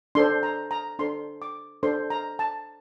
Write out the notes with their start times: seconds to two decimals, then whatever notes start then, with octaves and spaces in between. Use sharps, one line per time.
0.15 D4 A4 C5 C6
0.43 A#5
0.71 A#5
0.99 D4 A4 C5 C6
1.42 D6
1.83 D4 A4 C5 C6
2.10 A#5
2.39 A5